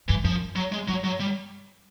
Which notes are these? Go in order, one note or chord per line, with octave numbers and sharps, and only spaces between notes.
G2 E3
F#2 F3
F#3
G#3
G2 F#3
F#3
G3